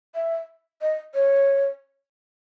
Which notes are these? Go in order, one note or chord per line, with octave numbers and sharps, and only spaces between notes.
E5
D#5
C#5